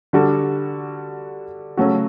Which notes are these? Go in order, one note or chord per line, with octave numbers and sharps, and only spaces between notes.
D3 G3 D4 F#4 A4
C#3 F#3 A3 C#4 F#4